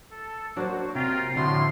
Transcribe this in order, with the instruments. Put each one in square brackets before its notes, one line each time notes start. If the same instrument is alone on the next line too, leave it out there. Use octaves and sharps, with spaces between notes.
[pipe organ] A4
[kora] F#3 A#3 C5 [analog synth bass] D4 [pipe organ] F#4
[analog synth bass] C3 [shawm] F4 [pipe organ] G5 A#5
[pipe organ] A2 F3 [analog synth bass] D3 [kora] A3 E4 F#4 [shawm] C6